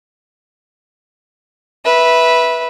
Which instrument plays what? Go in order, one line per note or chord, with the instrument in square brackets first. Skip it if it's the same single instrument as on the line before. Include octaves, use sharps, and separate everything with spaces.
[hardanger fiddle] B4 E5